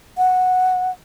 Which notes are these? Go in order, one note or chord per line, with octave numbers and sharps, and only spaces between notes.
F#5